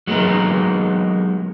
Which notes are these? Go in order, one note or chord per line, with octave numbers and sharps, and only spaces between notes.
F#3 G#3 A#3 B3 D#4